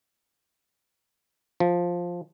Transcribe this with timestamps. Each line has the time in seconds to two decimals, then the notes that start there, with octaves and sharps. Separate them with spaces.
1.60 F3